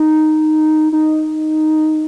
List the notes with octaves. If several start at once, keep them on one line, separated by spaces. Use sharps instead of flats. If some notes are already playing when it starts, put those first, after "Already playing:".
Already playing: D#4
D#4